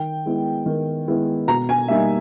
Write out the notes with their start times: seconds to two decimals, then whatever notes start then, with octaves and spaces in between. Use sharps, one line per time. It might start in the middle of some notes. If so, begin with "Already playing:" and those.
Already playing: D#3 G5
0.26 G#3 B3 E4
0.66 D#3
1.08 G#3 B3 E4
1.47 B2 A#5
1.69 G#5
1.88 G3 A#3 D#4 E5